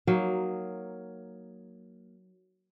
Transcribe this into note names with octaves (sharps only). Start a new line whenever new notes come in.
F#3 A#3 D#4